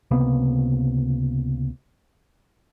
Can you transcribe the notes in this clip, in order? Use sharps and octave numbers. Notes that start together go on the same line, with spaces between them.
C#2 C3 A#3 B3